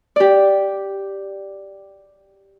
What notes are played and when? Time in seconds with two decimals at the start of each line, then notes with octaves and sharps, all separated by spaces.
0.16 G4 D5